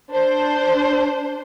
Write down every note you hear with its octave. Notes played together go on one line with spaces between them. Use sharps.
D4 C5